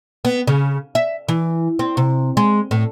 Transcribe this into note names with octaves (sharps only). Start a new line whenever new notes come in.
B3
C#3
E5
E3
C4
C3
G#3
A2